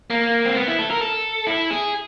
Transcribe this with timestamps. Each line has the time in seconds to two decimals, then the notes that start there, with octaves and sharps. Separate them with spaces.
0.10 A#3
0.45 C4
0.56 B3
0.68 E4
0.79 A4
0.91 A#4
1.01 A4
1.47 E4
1.70 G#4